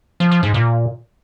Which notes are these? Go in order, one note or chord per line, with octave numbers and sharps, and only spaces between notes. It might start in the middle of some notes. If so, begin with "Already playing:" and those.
F3
F3
G#2
A#2